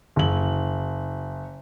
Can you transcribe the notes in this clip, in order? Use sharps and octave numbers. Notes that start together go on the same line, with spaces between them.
F#1 F#7